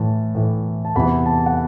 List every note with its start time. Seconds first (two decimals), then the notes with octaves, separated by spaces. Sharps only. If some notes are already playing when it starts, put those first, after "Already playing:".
Already playing: A2 E3 A5
0.35 A2 E3
0.85 A5
0.95 E2 C3 E3 B5
1.26 A5
1.46 F#5